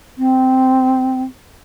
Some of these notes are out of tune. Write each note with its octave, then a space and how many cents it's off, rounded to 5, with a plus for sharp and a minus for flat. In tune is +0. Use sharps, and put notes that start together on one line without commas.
C4 -10